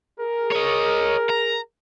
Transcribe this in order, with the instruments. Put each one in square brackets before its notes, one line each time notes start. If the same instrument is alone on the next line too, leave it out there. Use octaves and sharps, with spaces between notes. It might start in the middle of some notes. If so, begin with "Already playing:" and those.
[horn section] G#4 A#4
[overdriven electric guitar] C#5 D#5
A#5